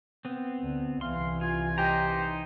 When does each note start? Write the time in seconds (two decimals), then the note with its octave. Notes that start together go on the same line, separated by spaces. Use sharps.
0.25 B3 C4
0.59 D2 D3
1.01 C2 E3 F5 C6
1.41 F4 G#5
1.78 G4 C5 D#5 A#5
2.09 D#4